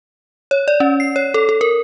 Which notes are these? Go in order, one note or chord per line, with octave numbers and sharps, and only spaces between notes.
C#5
D5
C#4
C7
C#5
A4
A4
A#4